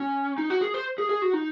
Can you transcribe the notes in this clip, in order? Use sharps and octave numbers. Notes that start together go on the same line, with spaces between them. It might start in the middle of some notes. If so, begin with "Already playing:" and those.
Already playing: C#4
D#4
F#4
G#4
C5
G#4
G#4
F#4
D#4